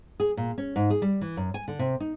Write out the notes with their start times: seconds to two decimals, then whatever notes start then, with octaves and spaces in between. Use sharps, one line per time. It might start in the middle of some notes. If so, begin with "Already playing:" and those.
0.20 G#4
0.37 A#2
0.58 C#4
0.76 G#2
0.90 G#4
1.02 G3
1.21 E3
1.37 F#2
1.54 G#5
1.68 D3
1.79 C3
2.00 D#4